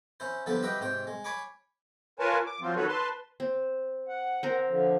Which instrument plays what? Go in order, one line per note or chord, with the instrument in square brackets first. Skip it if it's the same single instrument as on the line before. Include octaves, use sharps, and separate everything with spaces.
[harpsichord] C#4 E4 C5
D3 F3 G3 B3 A4 C5
F#4 G4 B4 D#5 E5 G5
G#2 C3 C5 G5
G#3
C#5 G#5 B5 C#6 D6
[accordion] F4 A#4 B4 C#5 G#5 A5
D6
F3 F#3 C4 F4
D#3 F#4 A4 B4 C#5
B4 A5 C6
[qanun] C4
[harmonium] F#5
[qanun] C4 A#4
[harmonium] D3 F3